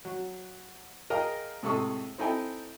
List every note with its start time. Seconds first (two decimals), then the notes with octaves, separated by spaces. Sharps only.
0.05 F#3
1.10 G#4 A#4 D#5 F5 G5 A#5
1.63 A2 C3 G#3 A4 C#6 D#6
2.18 C4 D#4 E4 A4 G5 G#5